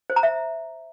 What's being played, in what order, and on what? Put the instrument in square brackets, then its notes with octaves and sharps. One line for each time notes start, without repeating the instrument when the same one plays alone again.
[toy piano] C5
A#5
E5